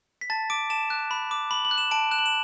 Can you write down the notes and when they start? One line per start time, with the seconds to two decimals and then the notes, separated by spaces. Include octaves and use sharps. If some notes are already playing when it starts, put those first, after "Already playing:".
0.21 B6
0.30 A5 A6
0.50 D6 D7
0.70 A5 E7
0.90 F#6
1.11 B5
1.31 D6
1.51 B5 F#7
1.65 F#7
1.71 F#6
1.78 E7
1.91 A5 D7
2.11 F#6 E7
2.19 F#7
2.26 E7